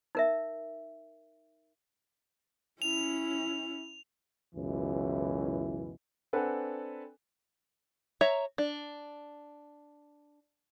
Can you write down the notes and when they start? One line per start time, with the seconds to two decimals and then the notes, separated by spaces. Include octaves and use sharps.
0.15 D#4 A#4 E5
2.82 C#4 E4 F7
4.55 C#2 F#2 B2 E3 E4
6.33 C4 D4 A4 B4 F#5 G#5
8.21 C#5 E5 A#5
8.58 D4